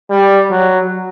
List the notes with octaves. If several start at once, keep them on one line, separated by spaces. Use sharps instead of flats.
G3
F#3